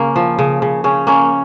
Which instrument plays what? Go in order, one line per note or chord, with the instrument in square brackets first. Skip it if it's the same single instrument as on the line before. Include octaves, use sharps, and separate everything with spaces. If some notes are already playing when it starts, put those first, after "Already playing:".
Already playing: [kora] C#3 A#3 [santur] C#4
[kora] F3
C#3
C#3
[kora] C#3 [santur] C#4
[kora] A#3 [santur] C#4